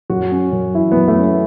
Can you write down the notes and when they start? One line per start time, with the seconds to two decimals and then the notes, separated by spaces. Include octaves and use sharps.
0.10 F#2 F#4
0.32 C#4
0.52 F#2
0.74 E3 E4
0.92 F#2 B3
1.08 A3
1.18 C#4
1.24 B3